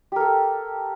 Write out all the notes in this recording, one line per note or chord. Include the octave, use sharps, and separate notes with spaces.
G4 A4 A#4